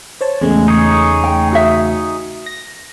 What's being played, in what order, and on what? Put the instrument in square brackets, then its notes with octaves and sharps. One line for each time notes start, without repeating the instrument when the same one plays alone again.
[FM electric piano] C5 C#5 A5
[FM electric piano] E2 C#3 A3 [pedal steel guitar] G#3
[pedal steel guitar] D#4 G#4 C#5
[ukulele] G5
F#4 E5
[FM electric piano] A#6